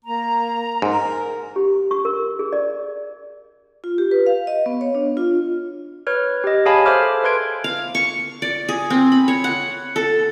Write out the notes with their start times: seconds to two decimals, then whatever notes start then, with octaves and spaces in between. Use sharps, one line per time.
0.04 A#3 A#5
0.82 G#2 A#4
1.56 G4
1.91 C#6
2.05 A#4
2.39 G#4
2.53 D5
3.84 F4
3.98 G4
4.11 B4
4.26 F5
4.47 D#5
4.66 B3
4.81 C#5
4.95 D4
5.17 F4
6.07 B4 C#5 F6
6.44 G4 D#5
6.66 G#4 C#5 F5 G#5 A5 B5
6.86 A4 C5 E5 D6 F6
7.24 B4 C6 G#6 D7
7.64 F5
7.95 C#6
8.42 D5
8.69 G#4
8.90 C4
9.12 B5
9.28 C#5
9.44 F#5
9.96 A4